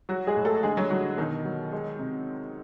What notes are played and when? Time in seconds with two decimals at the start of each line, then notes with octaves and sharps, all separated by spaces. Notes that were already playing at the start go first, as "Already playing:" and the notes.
0.09 F#3 F#4
0.27 G#3 G#4
0.36 A2
0.45 A3 A4
0.63 D3 G#3 G#4
0.77 F#3 F#4
0.90 D3 F#3 F#4
1.17 B2 D#3 D#4
1.45 F#3
1.72 G#3
1.99 C3